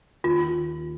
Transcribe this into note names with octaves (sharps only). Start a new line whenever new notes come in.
D#2 F4